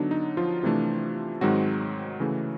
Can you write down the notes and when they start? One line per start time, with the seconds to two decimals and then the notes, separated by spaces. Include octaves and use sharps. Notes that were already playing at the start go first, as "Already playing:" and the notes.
Already playing: D3 F#3 B3 D4 D#4
0.11 D#4
0.37 F3 F4
0.63 C3 E3 A3 D4
1.41 G#2 D#3 F#3 G#3 C4 F#4
2.20 C#3 E3 A3